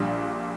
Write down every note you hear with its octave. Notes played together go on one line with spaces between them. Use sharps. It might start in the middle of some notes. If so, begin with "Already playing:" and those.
Already playing: A#1 A#2 G3 D4